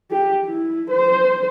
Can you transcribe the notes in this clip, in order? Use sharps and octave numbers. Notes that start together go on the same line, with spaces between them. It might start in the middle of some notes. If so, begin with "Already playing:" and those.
G4
E4
C5